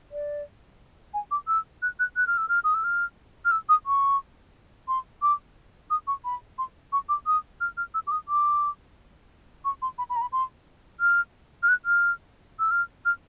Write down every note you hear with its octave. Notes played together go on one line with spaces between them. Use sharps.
D5
G#5
D6
E6
F#6
F#6
F#6
F6
E6
F6
D#6
E6
F6
F6
E6
D#6
C#6
C6
D6
D#6
C#6
B5
C6
C#6
D6
D#6
F6
F6
E6
D6
D#6
D6
C#6
C6
B5
B5
A#5
B5
C6
F6
F6
F#6
F6
E6
F6
F6